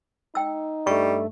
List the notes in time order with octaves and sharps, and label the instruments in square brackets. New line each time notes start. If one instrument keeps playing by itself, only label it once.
[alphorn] D#4 [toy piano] G5 E6
[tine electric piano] G2 A3 [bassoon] G3 [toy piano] C#6